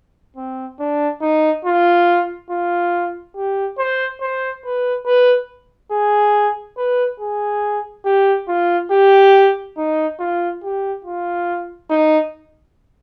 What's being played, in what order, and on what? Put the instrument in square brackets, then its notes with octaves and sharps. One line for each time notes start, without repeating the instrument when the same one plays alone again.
[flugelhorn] C4
D4
D#4
F4
F4
G4
C5
C5
B4
B4
G#4
B4
G#4
G4
F4
G4
D#4
F4
G4
F4
D#4